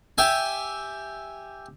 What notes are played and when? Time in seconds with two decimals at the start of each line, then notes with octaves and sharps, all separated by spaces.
0.18 G4 E5 G#5